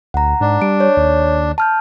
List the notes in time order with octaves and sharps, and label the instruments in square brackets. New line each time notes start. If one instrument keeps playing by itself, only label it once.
[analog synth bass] D2 [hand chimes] F#5 A#5
[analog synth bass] G#2 [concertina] D4
[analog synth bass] G3 [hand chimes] D7
[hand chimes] C#5
[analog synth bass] D#2
[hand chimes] A5 F6 G6